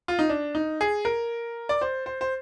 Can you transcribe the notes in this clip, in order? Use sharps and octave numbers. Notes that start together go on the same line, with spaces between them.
F4
D#4
D4
D#4
G#4
A#4
D5
C5
C5
C5